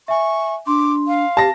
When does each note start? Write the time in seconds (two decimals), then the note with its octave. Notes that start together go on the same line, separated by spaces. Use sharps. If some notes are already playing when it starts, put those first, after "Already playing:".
0.08 E5 G#5 C#6
0.67 D4 C6 D6
1.08 F5
1.37 G4 A5 A#6